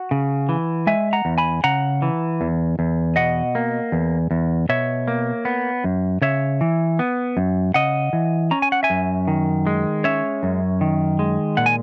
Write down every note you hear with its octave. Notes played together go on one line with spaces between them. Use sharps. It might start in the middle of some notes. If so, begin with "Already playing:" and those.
Already playing: F#4
C#3
E3
G#3 E5 G#5
F#5 A#5
E2
G#5 B5
C#3 F#5 A#5
E3
E2
E2
B2 D#5 F#5
A#3
E2
E2
B2 C#5 E5
A#3
B3
F#2
C#3 C#5 E5
E3
B3
F#2
C#3 D#5 F#5
E3
C#4 A#5
G#5
F#5
E5 G#5
F#2
D#3
G#3
C#4 C#5 E5
F#2
D#3
G#3
A#2 F#5
G#5